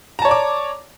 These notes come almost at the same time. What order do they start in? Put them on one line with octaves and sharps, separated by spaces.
A#5 A5 C#5 D5 D6